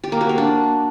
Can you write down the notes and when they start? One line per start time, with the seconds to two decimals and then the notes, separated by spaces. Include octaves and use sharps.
0.04 G4
0.12 A#3
0.21 F#4
0.29 A#3
0.38 D4